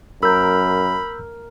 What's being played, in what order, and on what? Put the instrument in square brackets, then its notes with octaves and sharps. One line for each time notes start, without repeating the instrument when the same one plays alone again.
[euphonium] F#2 [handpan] A#4 [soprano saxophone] B5 [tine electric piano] E6 G6